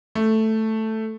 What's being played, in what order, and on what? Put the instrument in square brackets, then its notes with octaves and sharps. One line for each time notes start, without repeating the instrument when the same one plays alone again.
[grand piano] A3